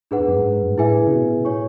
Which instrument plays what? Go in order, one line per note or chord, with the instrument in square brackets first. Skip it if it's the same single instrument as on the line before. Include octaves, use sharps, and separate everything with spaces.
[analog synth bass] G#2 [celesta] D4 G#4 B4 F#5
[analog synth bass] E2
F#2
G#2
F#2
G#2
[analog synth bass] A2 [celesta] E4 G#4 B4 E5 G#5
[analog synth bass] C#3
B2
[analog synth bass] A2 [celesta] C#5 G#5 C#6